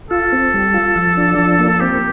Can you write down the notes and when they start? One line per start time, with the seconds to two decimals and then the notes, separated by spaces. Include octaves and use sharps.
0.11 F4 A4
0.32 C4
0.54 G3
0.74 F4
0.96 F3
1.17 D4
1.39 F3
1.59 A#3
1.81 C4 G4